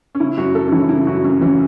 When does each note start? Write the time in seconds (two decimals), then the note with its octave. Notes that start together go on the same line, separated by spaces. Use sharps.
0.15 C#4
0.20 C#3 E4
0.37 F#2 F#4
0.55 F#2 A4
0.68 C#4
0.72 E3 E4
0.89 C#3 E4
1.07 F#2 F#4
1.24 F#2 C#4
1.41 E3 C#4